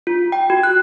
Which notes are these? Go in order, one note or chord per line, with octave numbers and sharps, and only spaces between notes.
F4
G5
F#4
F#6